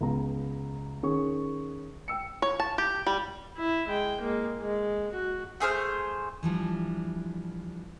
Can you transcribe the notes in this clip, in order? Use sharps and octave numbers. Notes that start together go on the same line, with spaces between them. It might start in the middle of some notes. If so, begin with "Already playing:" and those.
C#2 B3 A#5
D#3 C#4 G#4 C#6
G5 E6 C#7
C#5
A5
G4
G3
E4
G#3 G5
G#3 A#3
G#3
F#4
A3 G#4 C5 F6
E3 F3 G3 D4